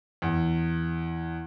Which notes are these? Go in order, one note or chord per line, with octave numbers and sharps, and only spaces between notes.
E2